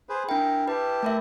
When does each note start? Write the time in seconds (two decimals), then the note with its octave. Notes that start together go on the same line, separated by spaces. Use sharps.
0.09 G#4 B4 C5
0.29 D4 E4 A#4 G5
0.68 E4 G4 B4 A5
1.03 A3 A#4 E5